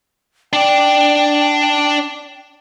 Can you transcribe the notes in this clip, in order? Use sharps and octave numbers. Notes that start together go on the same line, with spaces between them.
D4 D5 G5